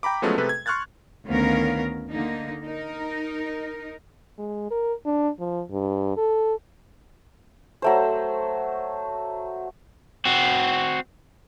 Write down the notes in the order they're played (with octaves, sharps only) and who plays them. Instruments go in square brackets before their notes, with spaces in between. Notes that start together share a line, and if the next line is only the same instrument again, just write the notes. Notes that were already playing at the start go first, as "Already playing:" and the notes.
[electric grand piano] G5 A#5 B5 D6
F3 F#3 G#3 A3 B3 C#4
C3 A3 G#4 A4 B4
G#6
C6 C#6 F6 F#6 G#6 A6
[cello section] D2 D#3 B3 C#4 A#4 F5
D3 A#3 D#4
D#4 A#4
[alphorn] G#3
A#4
D4
F3
G2
A4
[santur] F#3 A3 C5
[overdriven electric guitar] C4 F#4